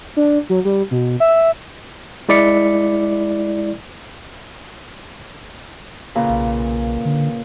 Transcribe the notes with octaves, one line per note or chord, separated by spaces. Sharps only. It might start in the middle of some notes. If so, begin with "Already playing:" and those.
D4
F#3
G3
B2
E5
G#3 E4 D5 B6 C#7
A#2 C#3 B4
B1
D3